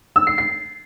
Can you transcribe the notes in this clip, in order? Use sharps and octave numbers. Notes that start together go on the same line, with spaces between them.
E6
C7
C7